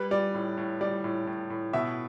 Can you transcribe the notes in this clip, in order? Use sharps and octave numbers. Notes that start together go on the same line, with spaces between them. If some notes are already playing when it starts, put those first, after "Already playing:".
Already playing: G3 B4
G3 D5
A2
A2
G3 D5
A2
A2
A2
B2 E5